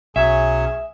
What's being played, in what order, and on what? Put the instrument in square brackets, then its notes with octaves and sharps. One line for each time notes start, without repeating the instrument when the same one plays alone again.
[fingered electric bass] B1 [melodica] F#3 C#4 C#5 [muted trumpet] G#4 [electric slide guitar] E5